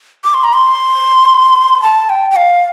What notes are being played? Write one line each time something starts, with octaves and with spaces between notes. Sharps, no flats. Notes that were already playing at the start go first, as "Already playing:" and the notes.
D6
C6
A#5
C6
A5
G5
G5
F5